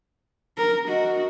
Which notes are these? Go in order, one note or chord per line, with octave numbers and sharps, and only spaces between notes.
A#4
F#4 D#5